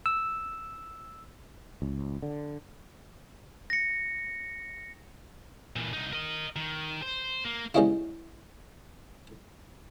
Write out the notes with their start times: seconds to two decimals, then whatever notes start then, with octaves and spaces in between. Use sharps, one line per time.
0.06 E6
1.82 C#2
2.22 D3
3.70 A#6 C#7
5.76 A#2 E3
5.93 C2 D#4
6.13 A#4 D#5
6.56 D#3
7.02 C5
7.44 A#3
7.74 G3 G#3 B3 C#4 D#4 E4